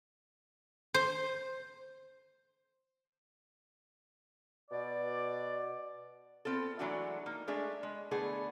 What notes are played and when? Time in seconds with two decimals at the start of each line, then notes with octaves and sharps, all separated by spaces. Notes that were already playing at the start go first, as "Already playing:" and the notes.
0.94 C5
4.71 B2 D5
6.45 B3 C4 F4 A4
6.79 E3 F#3 G#3 A3 D4 F#4
7.26 A#3 D#4
7.47 G#3 A3 D4 G#4 E5
7.83 G#3
8.11 D3 A3 B3 E4 G#4